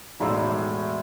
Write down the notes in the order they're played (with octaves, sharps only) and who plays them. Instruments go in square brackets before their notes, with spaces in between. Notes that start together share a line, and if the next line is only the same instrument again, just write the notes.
[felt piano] E1 A2 D#4 D5 C6 E6